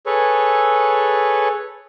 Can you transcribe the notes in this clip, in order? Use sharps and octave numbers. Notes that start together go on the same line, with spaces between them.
G#4 A4 B4 C#5